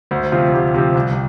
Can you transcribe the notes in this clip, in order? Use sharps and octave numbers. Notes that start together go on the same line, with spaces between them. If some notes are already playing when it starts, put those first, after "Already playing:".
D2 C5
C3 F3 F4
D2 G4
C3 F3 G4
C2